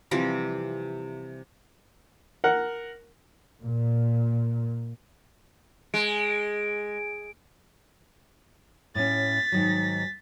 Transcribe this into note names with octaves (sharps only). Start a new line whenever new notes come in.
C3 E3 F3 G3
A#4 F#5
A#2
G#3 D7
A2 C#4 A6 B6
G#2 D#3 F#3